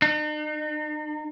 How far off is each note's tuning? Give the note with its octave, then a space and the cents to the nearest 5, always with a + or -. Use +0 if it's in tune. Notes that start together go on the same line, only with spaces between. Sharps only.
D#4 -45